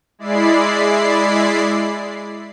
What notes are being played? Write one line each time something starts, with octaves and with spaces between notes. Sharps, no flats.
G#3 E4 D5 B5 C7